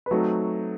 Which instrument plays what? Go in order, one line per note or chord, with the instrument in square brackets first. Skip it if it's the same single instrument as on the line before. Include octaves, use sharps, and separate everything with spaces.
[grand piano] B4
[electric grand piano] F#3 A3 C4 D#4 [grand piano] F#4 A4